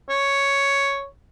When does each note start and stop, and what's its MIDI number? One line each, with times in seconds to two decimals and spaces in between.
0.09 1.06 73